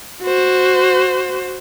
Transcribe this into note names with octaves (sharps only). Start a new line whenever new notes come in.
F#4 C5